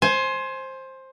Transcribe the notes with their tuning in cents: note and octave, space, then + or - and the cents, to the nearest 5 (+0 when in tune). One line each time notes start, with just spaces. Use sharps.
C5 +15 G#5 +25